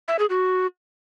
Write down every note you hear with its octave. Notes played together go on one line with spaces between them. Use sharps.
E5
G#4
F#4